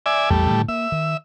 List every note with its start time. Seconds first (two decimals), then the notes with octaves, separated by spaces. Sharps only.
0.06 D5 E5 G#5
0.30 A1 E2 G3 A3
0.51 A2 D3 D#3
0.68 A#3 E5
0.92 D#3